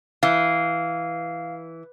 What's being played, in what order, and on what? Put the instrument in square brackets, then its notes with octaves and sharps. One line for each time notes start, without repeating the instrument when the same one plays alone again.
[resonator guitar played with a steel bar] E3 [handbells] F5